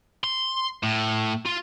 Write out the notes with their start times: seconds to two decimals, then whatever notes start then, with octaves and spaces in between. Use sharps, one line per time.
0.24 C6
0.83 A2
1.45 F4